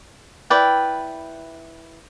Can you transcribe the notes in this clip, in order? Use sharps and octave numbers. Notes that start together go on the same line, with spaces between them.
E4 B4 D5 G5